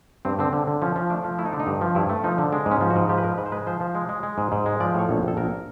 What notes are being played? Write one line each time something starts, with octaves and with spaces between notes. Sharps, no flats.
G2 C4
D3 C4
D3
D3
F3 C#4
F3
A3 D4
F3
A3 E4
D#4
D3 D4
D#4
G2
F3
G2 E4
A3
F3 D#4
D3
G#3 D4
G#2
C#4
F3
F#4
G#2
F3 G4
B4
G#2 A#4
G#2 B4
C5
G#3 B4
F3 C5
F3
G#3
G#3
G#3
G#2
G#2
G#3
F3 D5
A2 C#5
A#1
A#1 A4
A#1 A#4